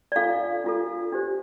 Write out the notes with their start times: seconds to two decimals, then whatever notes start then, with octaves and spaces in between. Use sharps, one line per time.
0.12 D5
0.16 D4 F4 A4 F5
0.64 D4 F4 A4
1.12 D4 G4 C5